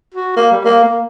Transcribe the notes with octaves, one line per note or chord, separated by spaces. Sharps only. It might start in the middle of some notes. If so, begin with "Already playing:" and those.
F#4
A#3
G3
A#3
A#3